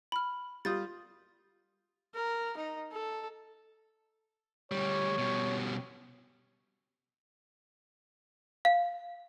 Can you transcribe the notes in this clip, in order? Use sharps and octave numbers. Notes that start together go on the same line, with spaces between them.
B5 F6
G3 F4 D#6 G6 A6
A#4
D#4
A4
D2 G3 C#5
B2 G3
F5